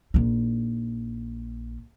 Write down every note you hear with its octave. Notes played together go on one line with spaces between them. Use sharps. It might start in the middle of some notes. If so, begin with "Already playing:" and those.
A#1 D#4